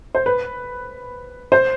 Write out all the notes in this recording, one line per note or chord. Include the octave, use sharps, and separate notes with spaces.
C5
B4
C5